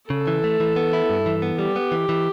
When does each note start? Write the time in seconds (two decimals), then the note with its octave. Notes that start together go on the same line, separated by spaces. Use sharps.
0.10 C#3 A4
0.27 E3
0.44 A3
0.60 E3
0.76 B3
0.93 E4
1.10 G2
1.26 E3
1.42 B3
1.59 G3 G4
1.76 B3
1.92 E3
2.09 E3